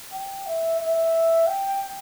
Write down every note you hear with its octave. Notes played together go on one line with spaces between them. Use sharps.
G5
E5
E5
G5